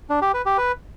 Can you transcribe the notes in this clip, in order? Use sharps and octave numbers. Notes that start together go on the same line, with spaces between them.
D4
G4
B4
G4
B4